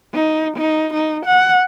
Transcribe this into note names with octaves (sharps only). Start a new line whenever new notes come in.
D#4
D#4
D#4
F#5